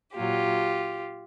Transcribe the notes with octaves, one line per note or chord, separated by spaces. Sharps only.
A#2 F#3 F4 G4